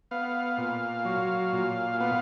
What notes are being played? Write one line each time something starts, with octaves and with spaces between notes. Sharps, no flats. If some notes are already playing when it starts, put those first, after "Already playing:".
B3 F5
A#2
F#3
A#2
B3 F5